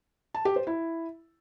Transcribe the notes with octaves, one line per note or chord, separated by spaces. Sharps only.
A5
G4
C5
E4